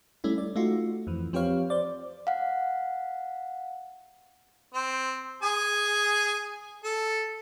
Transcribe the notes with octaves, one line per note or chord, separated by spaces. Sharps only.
G3 A3 C#4 E4
D5
A3 D#4 F4 F#4
F2 E3
F3 C4 G4 B4 C#5 F5
C5 D5
F5 F#5
C4
G#4 G#5
A4